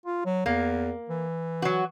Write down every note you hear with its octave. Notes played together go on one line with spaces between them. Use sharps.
F4
F#3
E2 A#3
E3
F#3 F#4